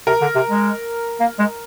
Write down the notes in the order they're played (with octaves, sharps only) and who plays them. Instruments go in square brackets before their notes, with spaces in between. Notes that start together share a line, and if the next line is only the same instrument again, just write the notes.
[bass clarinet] C3 [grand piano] A#4
[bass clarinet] D3
C3
G#3
A#3
G#3